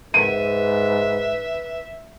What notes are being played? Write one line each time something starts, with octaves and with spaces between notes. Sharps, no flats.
G#2 B4 E5 D#7